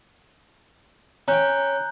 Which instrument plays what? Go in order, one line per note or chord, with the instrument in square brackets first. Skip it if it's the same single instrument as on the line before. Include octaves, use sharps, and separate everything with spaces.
[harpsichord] C#4 G5 [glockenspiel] A#5 F#6 G6